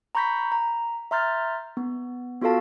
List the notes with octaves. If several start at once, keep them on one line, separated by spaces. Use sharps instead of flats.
A#5 B5 C#6 G6 A#6 B6
A#5
E5 A#5 C6 F6 G6 A6
B3
B3 F4 F#4 A4 F5 A5